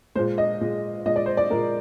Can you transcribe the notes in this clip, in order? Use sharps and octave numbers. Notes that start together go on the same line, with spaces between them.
A#2 G#3 C5
D#5
A#2 G#3
A#2 G#3 D#5
D5
C5
D5
A#2 G#3 A#4